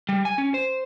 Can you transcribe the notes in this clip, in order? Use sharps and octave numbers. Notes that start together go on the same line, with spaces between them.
G3
G#5
C#4
C5